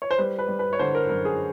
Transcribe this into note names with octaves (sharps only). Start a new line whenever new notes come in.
C#5
C5
G3 B4
B4
G3
B4
C#5
D3 C5
A#4
F#2 A#4
G#4